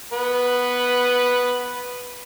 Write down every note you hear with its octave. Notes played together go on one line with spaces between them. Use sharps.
B3 B4